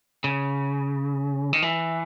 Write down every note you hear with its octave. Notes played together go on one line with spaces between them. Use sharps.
C#3
D#3
E3